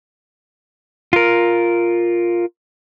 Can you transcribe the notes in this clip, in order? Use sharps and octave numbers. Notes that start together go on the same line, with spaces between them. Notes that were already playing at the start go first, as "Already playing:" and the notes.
F4 A#4